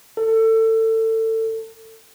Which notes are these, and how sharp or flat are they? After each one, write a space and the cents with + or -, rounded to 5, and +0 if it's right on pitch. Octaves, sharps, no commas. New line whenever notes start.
A4 +25